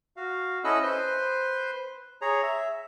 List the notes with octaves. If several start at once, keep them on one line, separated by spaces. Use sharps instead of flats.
F#4 F5
C#4 E4 A4 D#5 E6 F#6
B4 C5 C6
G#4 C#5 A#5
E5